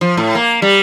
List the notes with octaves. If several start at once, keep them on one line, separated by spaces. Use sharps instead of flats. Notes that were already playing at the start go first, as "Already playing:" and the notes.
F3
A2
A#3
G3